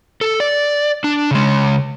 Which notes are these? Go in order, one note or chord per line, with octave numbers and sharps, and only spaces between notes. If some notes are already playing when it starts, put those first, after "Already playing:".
A4
D5
D4
C#3 G#3